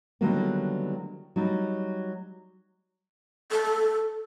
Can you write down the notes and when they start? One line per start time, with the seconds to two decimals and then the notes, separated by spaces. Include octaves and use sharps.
0.21 D3 D#3 F#3 G3 A#3 B3
1.36 F#3 G3 D#4
3.52 A4